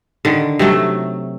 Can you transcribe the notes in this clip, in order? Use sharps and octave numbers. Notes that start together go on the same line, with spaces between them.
D3 D#3
C3 F#3 A3